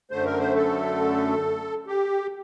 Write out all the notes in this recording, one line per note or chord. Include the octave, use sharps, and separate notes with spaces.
F#2 D3 A3 C5
A#4
C5
A4
G4